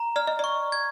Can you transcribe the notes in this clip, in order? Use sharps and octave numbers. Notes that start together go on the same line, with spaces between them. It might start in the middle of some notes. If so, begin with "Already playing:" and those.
Already playing: A#5
D5 F6
D#5
D5 C#6
G#6